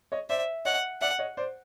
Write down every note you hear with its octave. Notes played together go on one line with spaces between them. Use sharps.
C#5 D#5
C5 D5 E5
C#5 D#5 F#5
D5 E5 F#5
C#5 D#5
C5 D5